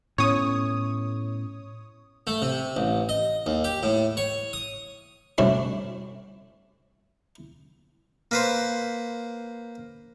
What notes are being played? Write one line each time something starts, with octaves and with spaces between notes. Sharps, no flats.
A2 B3 C#4 C#5 D#6
A3
C3
A1
D#5
D#2
G4
A2
C#5
D#6
C3 G3 A3 C#4 D4 F#4
A#3 B4 C5